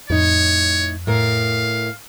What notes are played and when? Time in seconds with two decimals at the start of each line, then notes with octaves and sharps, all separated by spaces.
0.10 F2 A2 D#4 C#5
1.07 A2 A#4 F5